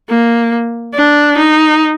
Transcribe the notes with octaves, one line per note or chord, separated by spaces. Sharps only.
A#3
D4
D#4